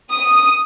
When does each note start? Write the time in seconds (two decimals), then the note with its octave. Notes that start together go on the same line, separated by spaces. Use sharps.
0.10 D#6